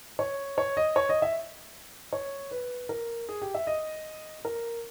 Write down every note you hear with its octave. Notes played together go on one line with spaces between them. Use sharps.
C#5
C#5
D#5
C#5
D#5
E5
C#5
B4
A#4
G#4
G4
E5
D#5
A#4